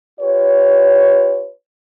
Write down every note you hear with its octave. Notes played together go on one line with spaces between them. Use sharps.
F4 G4 B4 C#5